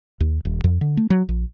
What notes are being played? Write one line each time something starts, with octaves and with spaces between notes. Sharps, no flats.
D#2
D#1
F2
D3
A3
F#3
A#1